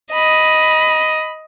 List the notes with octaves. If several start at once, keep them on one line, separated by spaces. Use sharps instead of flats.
D#5 B5